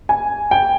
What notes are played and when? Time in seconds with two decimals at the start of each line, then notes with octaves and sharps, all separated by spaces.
0.09 G#5
0.51 G5